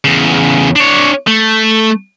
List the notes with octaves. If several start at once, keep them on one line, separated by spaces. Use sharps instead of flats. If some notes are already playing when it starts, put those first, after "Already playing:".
E2 C#3
D4 C#5
A3